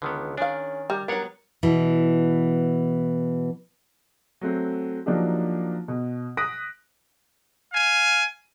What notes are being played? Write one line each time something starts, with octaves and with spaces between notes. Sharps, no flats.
C#2 D3 D#3 B3
D#3 C#4 D4 G#4 F5
G3 A#4
F#3 B3 D4 A#4 C#5 F#5
B2 E3
F#3 A3 C4
F3 F#3 A#3 D4 D#4 G4
B2
D#6 F#6 A#6 B6 D7
F5 G#5